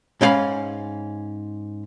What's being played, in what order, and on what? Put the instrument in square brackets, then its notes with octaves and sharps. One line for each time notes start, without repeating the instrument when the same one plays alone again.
[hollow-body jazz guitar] G#2 C#4 E4 G4 F5 B5